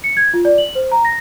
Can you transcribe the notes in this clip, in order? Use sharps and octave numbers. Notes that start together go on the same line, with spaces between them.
C#7
G#6
F4
D5
F#7
C5
A#5
A#6